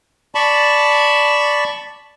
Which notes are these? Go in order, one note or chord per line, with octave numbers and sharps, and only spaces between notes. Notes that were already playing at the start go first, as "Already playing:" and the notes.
D5 A5 B5 C#6